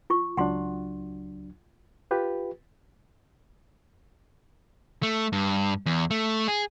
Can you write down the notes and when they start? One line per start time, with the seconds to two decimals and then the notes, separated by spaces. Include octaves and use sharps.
0.10 F4 C#6
0.37 C#2 F#3 D4 F#5 C6
2.11 F4 G4 B4
5.03 A3
5.33 G2
5.86 E2
6.11 A3
6.48 G#4